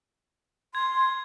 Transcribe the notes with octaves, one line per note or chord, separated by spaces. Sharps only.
C6 G#6